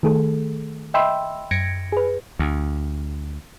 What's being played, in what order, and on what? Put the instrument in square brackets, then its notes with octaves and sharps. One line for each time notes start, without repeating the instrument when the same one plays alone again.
[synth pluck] D#3 A3 G#4 A4
D#5 E5 G5 B5 C6 E6
F#2 G#6 A#6 C#7 D7
G#4 B4
[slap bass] D2